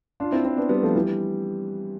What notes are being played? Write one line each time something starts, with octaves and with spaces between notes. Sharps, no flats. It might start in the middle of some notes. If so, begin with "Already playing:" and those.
D4 F4
C4 E4
C4 E4
B3 D4
G3 B3
F3 A3
E3 G3